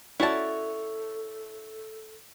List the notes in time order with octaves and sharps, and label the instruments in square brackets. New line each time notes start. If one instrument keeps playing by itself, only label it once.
[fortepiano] C#4 F#4 D5 [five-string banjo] E4 A5 [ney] A4 [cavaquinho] C#5 E5